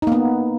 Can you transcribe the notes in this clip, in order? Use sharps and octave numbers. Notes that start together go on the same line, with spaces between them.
A#3 B3 D#4